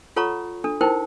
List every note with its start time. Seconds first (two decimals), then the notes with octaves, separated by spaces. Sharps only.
0.16 F4 A4 C#5 F#5 A#5 C#6
0.64 D4 A4
0.81 D#4 E4 A#4 C5 G5